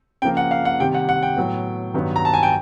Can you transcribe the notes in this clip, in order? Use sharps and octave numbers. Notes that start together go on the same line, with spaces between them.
C#3 F3 A#3 G5
F#5
F5
F#5
C3 D#3 G3 G5
F#5
F#5
G5
A2 F#3 B3
G2 D#3 F#3 B3
A#5
A5
G#5
G5